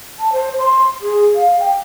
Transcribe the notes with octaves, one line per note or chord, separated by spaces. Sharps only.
A5
C5
C6
G#4
F5
G5